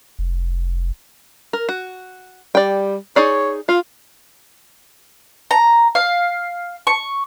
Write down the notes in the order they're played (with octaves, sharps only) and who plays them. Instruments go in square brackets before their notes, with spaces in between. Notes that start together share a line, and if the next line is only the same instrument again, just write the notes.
[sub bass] F1
[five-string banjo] A#4
F#4
[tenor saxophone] G3 [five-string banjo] D5 G5
[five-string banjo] D#4 G#4 D5 [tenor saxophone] C#5
[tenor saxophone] F4 [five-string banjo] F5
[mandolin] A#5
F5
C#6